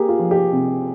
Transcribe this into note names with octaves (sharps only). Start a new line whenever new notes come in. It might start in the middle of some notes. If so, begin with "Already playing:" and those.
Already playing: A#3 G4 G#4
F4
F3
G4
C3